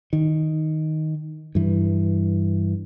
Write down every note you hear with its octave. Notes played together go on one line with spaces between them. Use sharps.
D#3
G2 E3